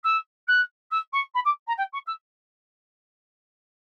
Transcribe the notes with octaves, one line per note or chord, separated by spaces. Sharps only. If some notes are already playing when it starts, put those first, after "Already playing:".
E6
F#6
E6
C#6
B5
D6
A#5
G5
C#6
E6